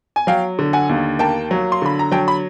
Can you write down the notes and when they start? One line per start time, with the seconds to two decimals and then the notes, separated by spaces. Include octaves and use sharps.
0.16 G#5
0.27 F#3 F5 G5
0.59 D3
0.73 F#5 G#5
0.89 D#2
1.19 A#3 G5 A5
1.51 F#3
1.72 C6
1.82 D3 B5
1.99 A#5
2.12 F#3 G5 A5
2.28 B5